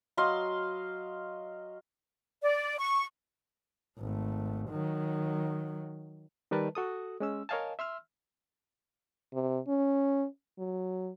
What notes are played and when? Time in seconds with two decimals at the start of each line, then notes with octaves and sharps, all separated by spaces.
0.17 F#3 D#5 F5 C6
2.42 D5
2.78 C#6
3.99 G#1 A3
4.69 D#3 F#3
6.51 D#3 G3 A#4 B4 A5
6.75 F#4 A4 D#6
7.20 G#3 C#4 E6
7.49 A#4 C#5 D#5 F5 G#5 A5
7.79 E5 C6 E6 F6
9.33 C3
9.67 C#4
10.59 F#3